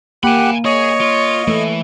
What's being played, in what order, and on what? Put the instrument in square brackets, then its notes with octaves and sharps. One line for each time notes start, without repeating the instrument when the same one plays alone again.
[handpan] A#3 [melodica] G4 F#5 [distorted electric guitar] G#5 B5
[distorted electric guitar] G#4 [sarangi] C#5 [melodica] D#5
[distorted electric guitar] F4
[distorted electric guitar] E3 [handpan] A3